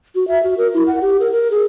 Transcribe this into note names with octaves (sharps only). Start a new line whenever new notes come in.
F#4
E5
F#4
A#4
E4
F#5
G4
A#4
A#4
G#4